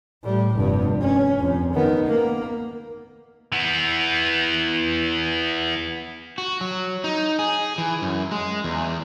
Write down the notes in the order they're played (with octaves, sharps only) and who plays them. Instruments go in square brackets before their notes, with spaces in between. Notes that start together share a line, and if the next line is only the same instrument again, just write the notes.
[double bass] A2 G3
F1 G2
C#4
F2
D#3 B3
A#3
[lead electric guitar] E3 B3
[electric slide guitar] F#4
F#3
D#4
G#4
E3
F#2
G#3
E2